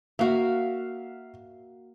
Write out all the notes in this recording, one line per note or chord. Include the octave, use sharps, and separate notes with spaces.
A#3 F#4 E5 F5